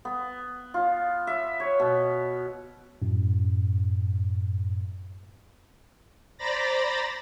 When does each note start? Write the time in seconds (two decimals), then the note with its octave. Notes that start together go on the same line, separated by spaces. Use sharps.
0.05 B3
0.74 F4
1.27 E5
1.60 C#5
1.80 B2
3.02 F#2 A2
6.38 C5 D5 A#5 B5 A6 A#6